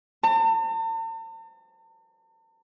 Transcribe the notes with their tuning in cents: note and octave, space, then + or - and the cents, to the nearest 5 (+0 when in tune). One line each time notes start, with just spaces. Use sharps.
A5 +45